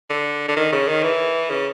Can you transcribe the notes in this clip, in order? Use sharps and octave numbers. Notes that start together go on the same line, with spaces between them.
D3
D3
D#3
C#3
D#3
E3
C#3